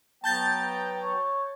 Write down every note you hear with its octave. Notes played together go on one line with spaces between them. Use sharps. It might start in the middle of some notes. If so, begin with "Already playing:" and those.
F#3 B3 G5 A5 A#5 G6 A6
C#5